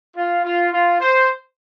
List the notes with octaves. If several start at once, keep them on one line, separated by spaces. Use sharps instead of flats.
F4
F4
F4
C5